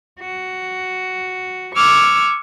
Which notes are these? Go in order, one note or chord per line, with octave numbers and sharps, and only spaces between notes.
F#4
C#6 D6 E6 F6 G#6